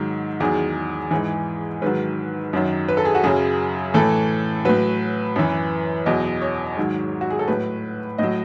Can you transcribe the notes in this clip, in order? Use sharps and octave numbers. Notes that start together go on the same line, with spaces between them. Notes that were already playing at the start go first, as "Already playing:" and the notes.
Already playing: G#2 D#3 F#3
E2 D#3 F#3 G#4
G#2 E3 G#4
G#2 D#3 F#3 B4
F#2 D#3 F#3
B4
A4
G#4
F#4
F#2 C#3 F#3 G#4
A2 E3 A4
A2 F#3 B4
F#2 E3
E2 B2 F#3 D#5
C#5
G#2 D#3 F#3
F#4
G#4
A4
A2 F#3 B4
A2 F#3 D#5